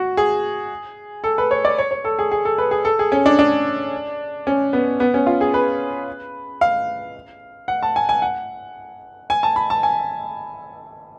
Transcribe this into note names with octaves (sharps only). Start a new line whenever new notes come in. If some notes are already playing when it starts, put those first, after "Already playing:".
Already playing: F#4
G#4
A4
B4
C#5
D5
C#5
C#5
A4
G#4
G#4
A4
B4
G#4
A4
G#4
C#4
D4
D4
C#4
B3
B3
C#4
F4
G#4
B4
F5
F#5
A5
G#5
G#5
F#5
G#5
A5
B5
A5
G#5